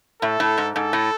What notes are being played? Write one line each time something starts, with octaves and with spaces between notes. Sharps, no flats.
A2 A4
A2
G#2
G#2 A4
A2